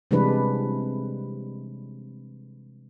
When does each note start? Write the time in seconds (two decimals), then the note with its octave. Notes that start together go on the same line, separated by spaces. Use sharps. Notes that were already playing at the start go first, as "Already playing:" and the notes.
0.11 C3 E3 G3 G#3 D4 B4